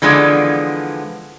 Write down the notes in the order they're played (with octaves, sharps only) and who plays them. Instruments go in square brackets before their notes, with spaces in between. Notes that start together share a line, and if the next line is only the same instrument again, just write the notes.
[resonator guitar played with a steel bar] D3 E3 F3 G#3 B3 D4